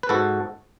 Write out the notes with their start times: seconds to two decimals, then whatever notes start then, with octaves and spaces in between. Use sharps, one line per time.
0.03 B4
0.09 G#2 F#4 A4